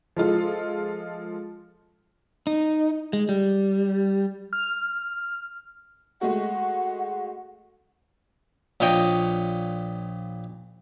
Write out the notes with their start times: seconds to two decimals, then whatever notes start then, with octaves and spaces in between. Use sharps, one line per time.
0.16 F3 G#3 F4 A4
2.47 D#4
3.13 G#3
3.29 G3
4.53 F6
6.21 G#3 A3 F#4 F#5
8.80 A#1 A#2 C#5 D#5 G5